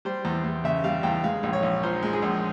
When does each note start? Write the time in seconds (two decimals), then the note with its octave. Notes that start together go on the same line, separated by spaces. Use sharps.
0.05 G3 C5
0.25 E2
0.44 E2
0.64 C#3 E5
0.84 G3 F5
1.03 E2 G5
1.24 G#3 F5
1.43 A#1
1.53 C#5
1.63 A#1
1.83 A#2 C5
2.02 G#3
2.13 G#4
2.22 A#1